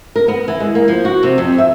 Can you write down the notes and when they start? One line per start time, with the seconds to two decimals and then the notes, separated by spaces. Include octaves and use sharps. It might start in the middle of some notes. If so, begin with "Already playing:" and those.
0.16 A#4
0.28 B3
0.48 E3
0.60 G#3
0.75 A#3
0.88 F3
1.05 F#4
1.23 C3
1.38 F2
1.58 E5